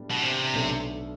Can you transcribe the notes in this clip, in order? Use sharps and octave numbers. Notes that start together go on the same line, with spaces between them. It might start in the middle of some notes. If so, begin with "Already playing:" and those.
Already playing: A2 G3 B3 D4
B2
C3
B1 B2 A3 D4 A4